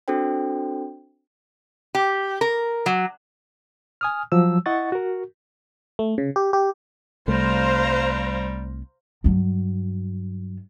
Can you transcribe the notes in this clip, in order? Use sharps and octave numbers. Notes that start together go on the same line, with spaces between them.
C4 D4 F#4 A4 C5 G5
G4
A#4
F#3
G#5 D#6 F6
F3 F#3 E6
E4 D#5 F#5 C#6 A6
F#4 A#4
A3
C#3
G4
G4
C2 G3 A3 C5 F5 A#5
G2 F#3